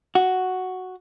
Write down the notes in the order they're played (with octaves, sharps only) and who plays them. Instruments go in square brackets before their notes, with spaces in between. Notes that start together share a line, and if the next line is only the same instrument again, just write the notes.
[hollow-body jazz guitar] F#4